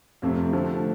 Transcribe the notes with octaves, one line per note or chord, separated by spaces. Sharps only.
F2 C3 F3 A3 C4
D3 F3 A3